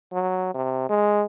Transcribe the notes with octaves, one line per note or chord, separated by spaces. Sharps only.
F#3
C3
G#3